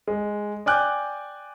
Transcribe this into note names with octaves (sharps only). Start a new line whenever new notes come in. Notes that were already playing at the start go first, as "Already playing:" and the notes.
G#3
D5 G5 G#5 D6 F#6 G6